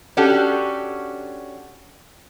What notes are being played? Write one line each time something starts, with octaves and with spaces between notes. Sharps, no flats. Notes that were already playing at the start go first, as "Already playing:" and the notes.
C#4 D4 F#4 G4 A4